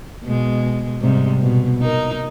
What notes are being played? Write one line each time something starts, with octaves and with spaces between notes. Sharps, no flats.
B2 G#3
G#2 C3 G3
B2
D#4 A#4